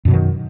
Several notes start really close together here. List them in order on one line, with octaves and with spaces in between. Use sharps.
F#2 B2 F#3 D#3